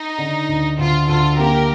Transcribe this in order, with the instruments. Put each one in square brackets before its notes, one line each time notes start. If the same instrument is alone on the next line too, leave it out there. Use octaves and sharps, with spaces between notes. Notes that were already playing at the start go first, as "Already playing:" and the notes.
Already playing: [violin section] D#4
[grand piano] D3
D2
[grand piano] D2 [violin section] F4
[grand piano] D2 [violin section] F4 A4
[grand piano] A#3 [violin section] G4 A#4